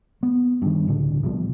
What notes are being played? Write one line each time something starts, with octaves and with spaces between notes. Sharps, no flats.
B3
G2 D#3
C#2 A2 D3
C2 B2 F3